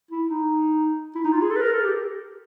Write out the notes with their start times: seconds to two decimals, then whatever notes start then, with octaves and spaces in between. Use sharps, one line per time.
0.11 E4
0.28 D#4
1.15 E4
1.24 D#4
1.33 F4
1.42 G#4
1.50 A4
1.56 B4
1.61 A#4
1.73 A4
1.80 G#4
1.84 G4